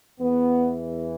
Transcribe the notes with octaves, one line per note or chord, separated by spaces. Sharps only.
E2 E3 B3